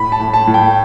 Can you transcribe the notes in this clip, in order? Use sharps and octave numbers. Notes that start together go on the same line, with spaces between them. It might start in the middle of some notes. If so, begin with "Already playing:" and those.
Already playing: A2 B5
A5
A2
A5
A2
G5